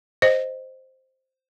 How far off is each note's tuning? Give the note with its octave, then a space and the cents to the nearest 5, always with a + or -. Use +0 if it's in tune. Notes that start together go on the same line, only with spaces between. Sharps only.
C5 +0 D#5 +0